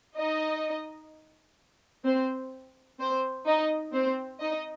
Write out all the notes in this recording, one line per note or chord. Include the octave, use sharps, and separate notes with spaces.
D#4 D#5
C4 C5
C4 C5
D#4 D#5
C4 C5
D#4 D#5